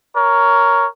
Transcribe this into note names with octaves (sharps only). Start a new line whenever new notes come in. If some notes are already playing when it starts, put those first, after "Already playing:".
A#4 C#5